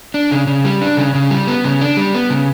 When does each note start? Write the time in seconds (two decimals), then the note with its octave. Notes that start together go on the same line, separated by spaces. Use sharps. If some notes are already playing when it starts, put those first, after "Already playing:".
0.14 D4
0.31 C#3
0.47 C#3
0.65 G3
0.81 D4
0.97 C#3
1.15 C#3
1.30 G3
1.47 B3
1.64 C#3
1.81 D4
1.97 G3
2.14 B3
2.30 C#3